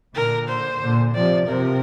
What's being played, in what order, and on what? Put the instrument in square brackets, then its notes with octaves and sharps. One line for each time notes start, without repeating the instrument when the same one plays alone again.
[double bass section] A#2 D3 [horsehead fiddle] A#4
[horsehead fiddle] C5
[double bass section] A#2 D3
[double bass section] C3 F3 [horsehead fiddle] D5
[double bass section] C3 F3 [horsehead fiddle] A#4